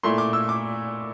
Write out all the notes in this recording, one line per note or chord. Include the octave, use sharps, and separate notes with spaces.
A#2 A3 E4 C6
D6
E6
D6